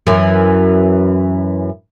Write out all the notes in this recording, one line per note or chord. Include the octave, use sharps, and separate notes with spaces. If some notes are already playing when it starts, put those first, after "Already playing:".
F#2 E3